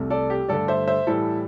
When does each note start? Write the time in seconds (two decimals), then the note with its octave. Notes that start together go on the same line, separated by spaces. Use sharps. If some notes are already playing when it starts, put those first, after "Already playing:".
Already playing: C2 C3 A3
0.10 A4 D5
0.30 G4
0.48 G2 D3 A3 A4 D5
0.68 C5 E5
0.87 C5 E5
1.07 A2 E3 G3 E4 A4